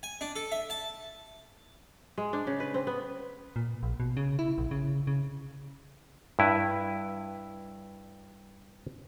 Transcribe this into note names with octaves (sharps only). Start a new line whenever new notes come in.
G#5
D4
A4
E5
A5
G#3
D4
C#3
B4
C4
B3
A#2
A#1
B2
C#3
E4
A#1
C#3
C#3
G2 E4 B4